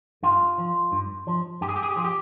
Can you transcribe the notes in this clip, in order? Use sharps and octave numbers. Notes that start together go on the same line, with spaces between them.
G2 F4
F3
G2
F3
G2 G4
G#4
G4
G#4
G4
F3 G#4
G4